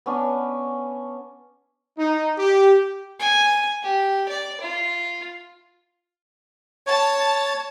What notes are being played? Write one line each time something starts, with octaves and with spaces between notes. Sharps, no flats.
B3 C#4 D4
D#4
G4
G#5
G4
D5
F4
C#5 A5 A6